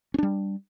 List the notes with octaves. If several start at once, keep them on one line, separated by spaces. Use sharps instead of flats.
G3 C#4 D4